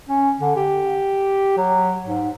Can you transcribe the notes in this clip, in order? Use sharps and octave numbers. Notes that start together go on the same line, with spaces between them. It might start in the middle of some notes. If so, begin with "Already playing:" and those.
C#4
D3
G4
F#3
G#2